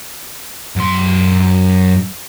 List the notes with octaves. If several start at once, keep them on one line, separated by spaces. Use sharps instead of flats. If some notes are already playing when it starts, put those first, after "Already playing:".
F#2 C6